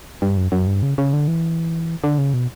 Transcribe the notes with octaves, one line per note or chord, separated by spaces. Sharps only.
G2
F#2
F#2
G2
C#3
C#3
D3
E3
D3
C#3
B2